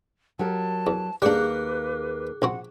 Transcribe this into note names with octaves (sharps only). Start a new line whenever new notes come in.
F#3 G4 A#4 A5
E2
D#2 G3 A#3 D4 G#4 B4 D6 F#6
A#1 C4 F#4 F#5